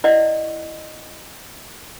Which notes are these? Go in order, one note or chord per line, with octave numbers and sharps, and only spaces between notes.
E4 D5 D#5 F#5